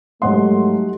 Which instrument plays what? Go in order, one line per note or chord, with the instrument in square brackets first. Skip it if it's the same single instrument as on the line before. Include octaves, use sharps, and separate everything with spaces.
[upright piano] G#2 C6 [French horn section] F#3 A3 [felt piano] G3 C#5 F#5